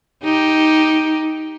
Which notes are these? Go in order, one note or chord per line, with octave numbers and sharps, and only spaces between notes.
D#4 G4